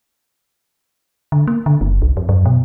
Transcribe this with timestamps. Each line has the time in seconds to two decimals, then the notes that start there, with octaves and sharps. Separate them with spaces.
1.32 D3
1.48 A#3
1.66 D3
1.81 F#1
2.02 C2
2.17 F2
2.29 F#2
2.46 B2